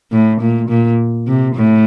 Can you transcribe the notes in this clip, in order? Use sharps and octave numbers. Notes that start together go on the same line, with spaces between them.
A2
A#2
A#2
C3
A2